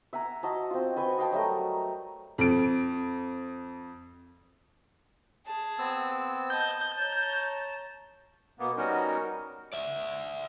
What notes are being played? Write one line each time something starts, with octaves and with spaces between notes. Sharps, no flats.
E5 F#5 G#5 A#5
F#4 D#5 A5
C4 F4
F#4 B4 G#5 C6
D#5 F5 G5 A5
F#3 G3 A3 A#4
F2 D7
G#4 A5
B3 C4 E6
D#5 A5 G6
C#5 A5 A#5
B2 A#3 B3
G3 B3 C#4 D#4 F#4 A#4
D5 E5